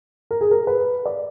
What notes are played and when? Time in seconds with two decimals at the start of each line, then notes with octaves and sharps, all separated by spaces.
0.31 A#4
0.41 G#4
0.51 A#4
0.67 B4
1.05 D5